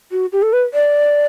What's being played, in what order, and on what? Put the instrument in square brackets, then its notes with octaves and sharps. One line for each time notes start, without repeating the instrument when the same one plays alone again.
[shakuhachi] F#4
G4
A4
B4
D5